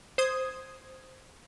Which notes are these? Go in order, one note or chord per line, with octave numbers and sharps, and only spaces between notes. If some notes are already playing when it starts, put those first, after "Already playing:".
C5 D#6 G#6